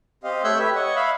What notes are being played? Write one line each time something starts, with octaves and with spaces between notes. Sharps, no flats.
C4 G4 D#5 F5
A3 C#5 E5 E6 F#6 G6
G4 B4 E5
C#5 D#5 F#5 C#6
E5 F5 B5